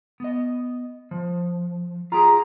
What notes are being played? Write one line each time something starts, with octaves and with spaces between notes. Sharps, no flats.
B3 D#5
F3
F4 G4 G#4 A#5